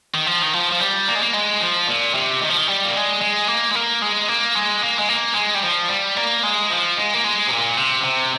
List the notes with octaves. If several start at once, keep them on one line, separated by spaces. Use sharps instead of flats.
D#3
F3
D#3
F3
F3
G3
A#3
G#3
A#3
G#3
F3
A#2
C3
D#3
F3
D#3
G3
A#3
G#3
G#3
A#3
G#3
A#3
G#3
A#3
G#3
A#3
G#3
A#3
G#3
G3
F3
G3
A#3
G#3
F3
G#3
A#3
G#3
C3
A#2
C3
C3